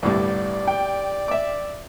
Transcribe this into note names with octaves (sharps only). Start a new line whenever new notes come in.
G1 C2 A2 G3 D5
G5
E5 D6